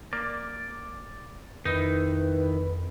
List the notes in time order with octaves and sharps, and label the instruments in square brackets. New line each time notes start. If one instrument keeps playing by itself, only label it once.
[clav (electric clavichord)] A#3 [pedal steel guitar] D5
[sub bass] F2 [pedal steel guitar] D#3 E4 [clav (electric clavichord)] D#4 [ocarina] B4